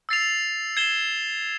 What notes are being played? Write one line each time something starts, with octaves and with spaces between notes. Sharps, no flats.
E6 A6 C7 F7
G#6 C7 E7 G7